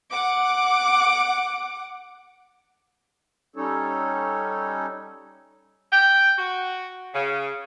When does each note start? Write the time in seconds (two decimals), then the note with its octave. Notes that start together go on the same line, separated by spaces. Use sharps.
0.12 F#5 D6
3.56 G3 C#4 D#4 A4 C#5
5.92 G5
6.38 F#4
7.14 C#3